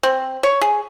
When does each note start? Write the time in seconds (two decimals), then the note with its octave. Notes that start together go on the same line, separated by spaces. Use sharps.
0.03 C4
0.43 C#5
0.61 G#4